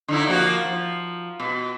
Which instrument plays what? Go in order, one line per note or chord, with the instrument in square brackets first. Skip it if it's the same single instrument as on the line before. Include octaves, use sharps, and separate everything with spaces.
[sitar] D3 D#4 E4
F3 A#3 F#4
F3
B2